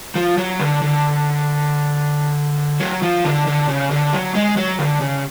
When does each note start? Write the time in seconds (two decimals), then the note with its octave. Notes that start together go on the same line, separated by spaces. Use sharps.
0.15 F3
0.38 F#3
0.60 D3
0.82 D3
2.80 F#3
3.02 F3
3.24 D3
3.47 D3
3.68 C#3
3.91 D3
4.13 F#3
4.35 G#3
4.57 F#3
4.79 D3
5.01 C#3